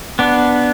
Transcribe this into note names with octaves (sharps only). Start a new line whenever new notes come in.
B3 D4